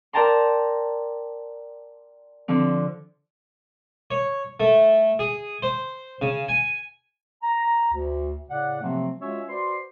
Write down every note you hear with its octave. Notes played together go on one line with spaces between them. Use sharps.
A#4 D5 G5 A5 A#5 C6
D3 F3 C4
C#5
A3
G#4
C5
C#3
G#5
A#5
D2
A2 C#3 D5 F#5
C3 F3 F#3 A3 A#3 C4
G#3 C#4 F4 F#4 C#5 E5
F#4 B4 C5 D5 C6